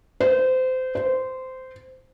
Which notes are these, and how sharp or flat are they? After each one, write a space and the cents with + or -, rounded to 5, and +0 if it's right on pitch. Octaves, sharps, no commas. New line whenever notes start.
C5 -25
C5 -15